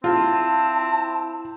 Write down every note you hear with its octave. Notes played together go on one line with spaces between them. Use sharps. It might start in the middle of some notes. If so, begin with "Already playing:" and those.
C4 E4 F4 A5